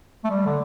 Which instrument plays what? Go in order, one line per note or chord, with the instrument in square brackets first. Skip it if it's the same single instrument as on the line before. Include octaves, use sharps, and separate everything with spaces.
[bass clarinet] A3
G3
D3